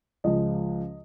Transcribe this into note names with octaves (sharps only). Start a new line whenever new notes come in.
C#2 C#3 F3 G#3 D#5